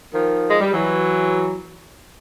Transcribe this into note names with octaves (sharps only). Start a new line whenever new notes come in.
D#3 F3
G#3
G3
E3 F#3